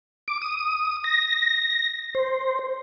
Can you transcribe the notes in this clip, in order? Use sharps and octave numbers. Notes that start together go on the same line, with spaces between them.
D6
D#6
A#6
C5